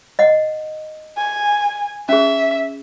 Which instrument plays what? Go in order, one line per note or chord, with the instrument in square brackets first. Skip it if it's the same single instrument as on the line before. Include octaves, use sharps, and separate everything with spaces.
[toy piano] D#5 F#5
[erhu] G#5
[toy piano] C#4 G#4 [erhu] E5